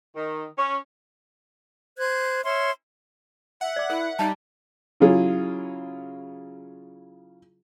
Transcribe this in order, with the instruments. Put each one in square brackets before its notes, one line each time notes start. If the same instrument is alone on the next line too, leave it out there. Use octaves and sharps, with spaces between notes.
[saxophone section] D#3
C#4
[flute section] C5 F#6 G#6
C#5 E5 C6 F6
[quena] E5 [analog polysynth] F#5
[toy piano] D5 D6
[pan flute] E4 [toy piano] A#4
[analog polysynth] G3 [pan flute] D#4 [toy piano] D5 D#5 A5
[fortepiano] C#3 F#3 E4 F4 G#4